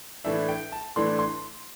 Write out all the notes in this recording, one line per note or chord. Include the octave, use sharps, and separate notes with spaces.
A2 E3 A3 D4 E5
G5
A5
A2 E3 A3 D4 C6
C6